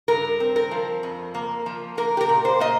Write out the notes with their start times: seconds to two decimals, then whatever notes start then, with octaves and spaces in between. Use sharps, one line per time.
0.08 G2 A#4
0.40 C4
0.56 A#4
0.71 F3
1.03 F2
1.35 A#3
1.66 F3
1.97 A#3 A#4
2.17 G4
2.21 A#4
2.29 A#2
2.45 C5
2.60 A#3 D#5